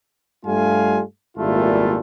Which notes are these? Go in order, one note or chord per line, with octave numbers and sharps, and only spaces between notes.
G2 G3 A3 F4 F5 G#5
G#1 A#2 G3 A3 E4 F4